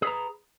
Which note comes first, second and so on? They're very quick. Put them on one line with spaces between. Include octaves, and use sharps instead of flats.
G#4 B4 A#5